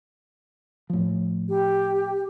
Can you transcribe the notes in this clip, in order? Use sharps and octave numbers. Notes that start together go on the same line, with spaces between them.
A2 F3
G4